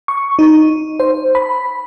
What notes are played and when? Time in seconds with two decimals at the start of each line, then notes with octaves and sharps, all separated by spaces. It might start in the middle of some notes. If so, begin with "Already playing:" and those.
0.08 C#6
0.39 D#4
1.00 C5
1.35 B5